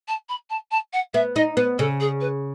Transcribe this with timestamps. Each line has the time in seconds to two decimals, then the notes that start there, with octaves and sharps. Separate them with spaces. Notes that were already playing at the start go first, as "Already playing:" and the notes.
0.08 A5
0.29 B5
0.50 A5
0.71 A5
0.93 F#5
1.14 B3 E5
1.36 D#4 D#5
1.57 B3 B4
1.79 C#3 A4
2.00 G#4
2.21 B4